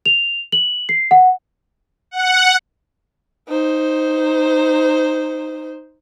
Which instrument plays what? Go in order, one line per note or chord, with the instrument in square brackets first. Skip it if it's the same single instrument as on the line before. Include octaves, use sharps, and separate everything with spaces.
[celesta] F7
F#7
C7
F#5
[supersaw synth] F#5
[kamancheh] D#4 C5